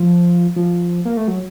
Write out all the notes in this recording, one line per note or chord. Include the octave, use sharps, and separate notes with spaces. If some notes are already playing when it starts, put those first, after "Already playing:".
Already playing: F3
F3
A#3
A3
F#3